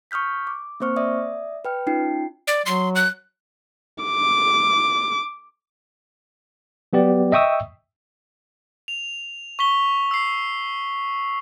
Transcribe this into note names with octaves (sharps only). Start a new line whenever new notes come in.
C#6 D#6 F6 G6 B6
D6
A#3 C4 C5 C#6 F6
D5 E5 D#6
B4 G5 F6
C#4 D#4 F4 G5 C7
D5
F#3 C6
F#6
D6
F#3 B3 G4 D5
D#5 E5 G5 C#6 D#6 E6
F7
C#6 B6 G7
E6 C7